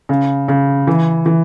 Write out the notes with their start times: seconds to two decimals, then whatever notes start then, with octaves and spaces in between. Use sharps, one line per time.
0.09 C#3
0.48 C#3
0.87 E3
1.26 E3